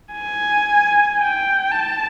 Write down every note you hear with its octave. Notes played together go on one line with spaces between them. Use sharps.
G#5
G5
A5